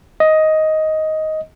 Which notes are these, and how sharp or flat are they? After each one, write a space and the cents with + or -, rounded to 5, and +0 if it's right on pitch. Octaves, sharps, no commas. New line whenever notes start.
D#5 +10